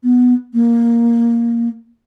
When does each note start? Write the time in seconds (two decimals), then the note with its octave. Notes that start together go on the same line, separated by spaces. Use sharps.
0.03 B3
0.54 A#3